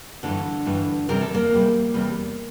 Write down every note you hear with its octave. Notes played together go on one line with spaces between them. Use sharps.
G2 D3 E3 A3 D4
G2 E3 A3
E2 C3 G3 A#4
A4
A#3 A#4
E2 C3 G3
E2 C3 G3